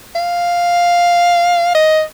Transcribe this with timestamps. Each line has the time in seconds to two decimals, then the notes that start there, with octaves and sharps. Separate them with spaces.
0.15 F5
1.75 D#5